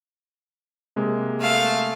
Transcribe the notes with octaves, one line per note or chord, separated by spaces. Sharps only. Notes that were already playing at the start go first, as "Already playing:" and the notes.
C3 G#3 A#3
A3 F5